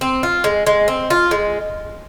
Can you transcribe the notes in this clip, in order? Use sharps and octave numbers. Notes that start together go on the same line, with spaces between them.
C4
F4
G#3
G#3
C4
F4
G#3